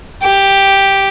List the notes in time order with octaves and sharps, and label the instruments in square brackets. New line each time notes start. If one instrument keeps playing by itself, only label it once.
[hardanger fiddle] G4